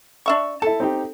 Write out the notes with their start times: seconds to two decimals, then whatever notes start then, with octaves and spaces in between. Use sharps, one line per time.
0.26 D4 E5 C#6
0.62 E4 A4 A5
0.80 C4 D#4 G4